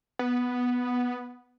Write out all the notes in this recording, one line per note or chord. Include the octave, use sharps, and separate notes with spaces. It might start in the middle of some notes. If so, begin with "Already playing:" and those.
B3